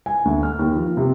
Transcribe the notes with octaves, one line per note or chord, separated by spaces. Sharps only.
G#5
D2
F6
D#2
F3
C3